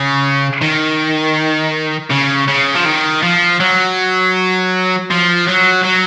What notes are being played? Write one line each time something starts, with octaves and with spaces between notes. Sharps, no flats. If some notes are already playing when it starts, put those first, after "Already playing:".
Already playing: C#3
D#3
C#3
C#3
F3
D#3
F3
F#3
F3
F#3
F#3